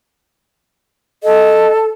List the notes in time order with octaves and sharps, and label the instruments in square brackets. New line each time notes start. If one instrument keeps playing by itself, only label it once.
[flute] A4 [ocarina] D#5